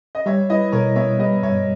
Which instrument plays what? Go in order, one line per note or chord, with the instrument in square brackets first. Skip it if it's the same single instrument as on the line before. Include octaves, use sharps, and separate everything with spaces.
[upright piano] D#5
[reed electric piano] G3 [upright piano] C#5 E5
[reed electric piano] E4 [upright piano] B4 D#5
[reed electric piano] B2 [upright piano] A#4 C#5
[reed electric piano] B3 [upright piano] C#5 E5
[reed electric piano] G3 [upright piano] B4 D#5
[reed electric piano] G2 [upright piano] C#5 E5